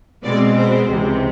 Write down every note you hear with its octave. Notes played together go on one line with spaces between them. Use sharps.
B2 G#3 C4 D5
C5
C#2 C3 E3 G#3